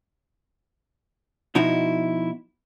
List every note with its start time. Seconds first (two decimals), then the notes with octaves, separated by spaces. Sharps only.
1.55 B2 F3 D#4 E4 F#4